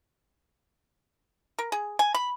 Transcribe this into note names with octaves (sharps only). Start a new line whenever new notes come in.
A#4
G#4
G#5
B5